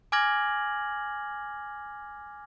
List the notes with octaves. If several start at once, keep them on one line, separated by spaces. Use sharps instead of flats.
G#5 D6 F6 G#6 A#6 F#7